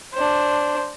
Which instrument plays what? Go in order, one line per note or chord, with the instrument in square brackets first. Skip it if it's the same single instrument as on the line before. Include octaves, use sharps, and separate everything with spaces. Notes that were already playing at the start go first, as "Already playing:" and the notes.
[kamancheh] D4 C5